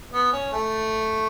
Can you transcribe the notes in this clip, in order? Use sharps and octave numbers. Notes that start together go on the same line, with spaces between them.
B3
C#4
A3